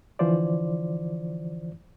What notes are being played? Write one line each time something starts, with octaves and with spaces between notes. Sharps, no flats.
D3 E3 F3 F4 C5 D5